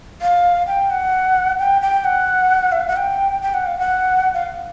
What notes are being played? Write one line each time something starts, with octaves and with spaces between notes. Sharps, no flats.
F5
G5
F#5
G5
G5
F#5
E5
F5
F#5
G5
G5
F#5
F5
F#5
F5